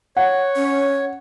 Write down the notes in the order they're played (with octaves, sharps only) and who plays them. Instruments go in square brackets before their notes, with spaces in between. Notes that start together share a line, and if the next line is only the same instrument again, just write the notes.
[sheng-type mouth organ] C#5 [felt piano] F#5
[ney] C#4